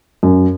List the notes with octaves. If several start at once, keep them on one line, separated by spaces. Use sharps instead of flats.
F#2